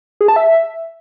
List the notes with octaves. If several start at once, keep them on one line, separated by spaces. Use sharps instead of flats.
G#4
A5
E5